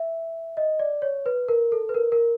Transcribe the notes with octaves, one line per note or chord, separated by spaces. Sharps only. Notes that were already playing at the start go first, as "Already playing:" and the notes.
Already playing: E5
D#5
D5
C#5
B4
A#4
A4
B4
A#4
A#4